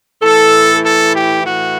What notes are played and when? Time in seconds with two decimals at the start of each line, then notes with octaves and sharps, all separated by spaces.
0.21 A2 E3 A4
0.81 A4
1.12 G4
1.42 A2 E3 F#4